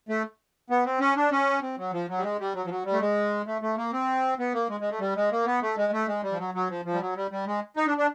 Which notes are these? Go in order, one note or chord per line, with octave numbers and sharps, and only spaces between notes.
A3
B3
C4
C#4
D4
C#4
C4
F#3
F3
F#3
G3
G#3
G3
F#3
F3
F#3
G3
A3
G#3
A3
A3
A#3
C4
B3
A#3
G#3
G#3
A3
G3
G#3
A#3
B3
A3
G#3
A3
G#3
G3
F3
F#3
F#3
F3
F3
G3
F#3
G3
G3
G#3
D#4
D4
D4